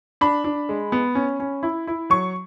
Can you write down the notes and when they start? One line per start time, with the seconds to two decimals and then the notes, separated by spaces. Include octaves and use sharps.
0.21 D4 B5
0.44 D4
0.69 G#3
0.92 B3
1.15 C#4
1.40 C#4
1.63 E4
1.87 E4
2.10 F#3 C#6